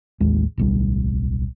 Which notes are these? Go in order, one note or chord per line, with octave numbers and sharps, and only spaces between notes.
A1 D#2 G#3
D1 B1 G3